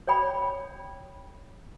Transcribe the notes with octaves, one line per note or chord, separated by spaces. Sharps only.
C#5 D5 G5 B5